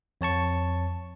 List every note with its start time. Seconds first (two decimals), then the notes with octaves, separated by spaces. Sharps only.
0.21 F2 C#5 A5 C#6